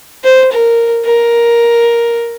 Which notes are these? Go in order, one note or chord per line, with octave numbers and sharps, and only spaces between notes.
C5
A#4
A#4